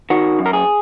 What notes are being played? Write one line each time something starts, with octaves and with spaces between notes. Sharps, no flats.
D#3 F#4
F#2
A#4
G#4